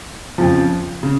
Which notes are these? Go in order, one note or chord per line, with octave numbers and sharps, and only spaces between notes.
F2 C#3 F3
C#3